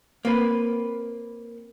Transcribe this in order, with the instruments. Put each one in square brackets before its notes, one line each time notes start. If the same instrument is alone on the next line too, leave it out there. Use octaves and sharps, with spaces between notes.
[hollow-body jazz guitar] A#3 C4 B4